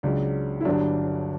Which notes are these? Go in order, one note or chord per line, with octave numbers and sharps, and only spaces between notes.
C#2 C#3 F#3 D4
E4
G1 G2 F#3 D4